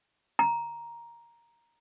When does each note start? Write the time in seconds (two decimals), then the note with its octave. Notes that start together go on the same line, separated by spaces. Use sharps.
0.39 A#5